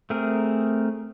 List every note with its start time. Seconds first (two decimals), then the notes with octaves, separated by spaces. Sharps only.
0.10 A3 C4 G#4 A#4